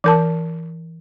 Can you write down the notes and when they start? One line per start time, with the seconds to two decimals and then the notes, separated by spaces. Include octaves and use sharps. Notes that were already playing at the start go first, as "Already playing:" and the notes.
0.04 E3 A#4 A5